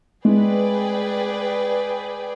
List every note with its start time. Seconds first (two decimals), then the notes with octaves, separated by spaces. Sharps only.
0.24 G#3 G#4 B4 D5 G5